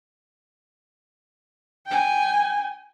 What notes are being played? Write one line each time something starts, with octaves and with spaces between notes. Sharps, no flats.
G5 G#5